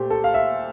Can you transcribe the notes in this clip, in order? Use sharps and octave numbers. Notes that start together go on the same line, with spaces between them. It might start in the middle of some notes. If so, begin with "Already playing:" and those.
Already playing: A#2 A3 G4 C5
A4
F5
E5